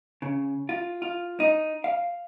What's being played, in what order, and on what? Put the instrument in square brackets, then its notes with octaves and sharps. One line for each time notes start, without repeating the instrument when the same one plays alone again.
[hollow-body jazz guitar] C#3
F4
F4
D#4
F5